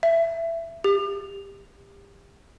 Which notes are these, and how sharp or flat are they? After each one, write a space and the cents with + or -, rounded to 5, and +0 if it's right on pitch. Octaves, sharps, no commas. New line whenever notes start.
E5 +15
G4 +25